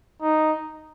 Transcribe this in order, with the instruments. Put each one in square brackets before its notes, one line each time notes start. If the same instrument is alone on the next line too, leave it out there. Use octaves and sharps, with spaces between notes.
[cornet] D#4